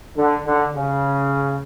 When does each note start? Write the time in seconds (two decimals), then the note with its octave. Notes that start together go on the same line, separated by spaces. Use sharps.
0.17 D3
0.45 D3
0.75 C#3